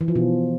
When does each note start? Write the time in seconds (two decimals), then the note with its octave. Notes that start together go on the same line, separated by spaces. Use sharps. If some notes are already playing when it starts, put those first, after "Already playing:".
0.01 E3
0.08 F3
0.15 B2